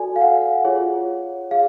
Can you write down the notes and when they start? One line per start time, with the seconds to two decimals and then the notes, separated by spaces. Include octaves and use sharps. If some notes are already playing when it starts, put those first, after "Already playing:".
Already playing: F#4 A4 D5 G#5
0.16 F5
0.22 F#5
0.65 F4 G#4 C#5
1.51 G#4 F5